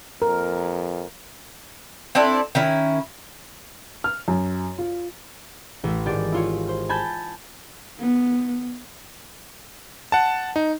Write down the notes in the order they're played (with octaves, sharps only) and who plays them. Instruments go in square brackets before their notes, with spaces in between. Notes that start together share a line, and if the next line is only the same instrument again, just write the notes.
[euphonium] F2 [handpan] A#4
[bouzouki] C4 D4 E4 A4
D#3 C#4 E4
[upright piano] F6
F#2
F4
[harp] A1 A3
G#1 G4 D5 A6
E4 F4 C#5
C5
G#5 A5 B5 G6 A6
[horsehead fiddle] B3
[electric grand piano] F#5 A5
D#4